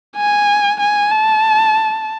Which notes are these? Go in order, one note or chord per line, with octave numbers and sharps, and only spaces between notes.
G#5
G#5
A5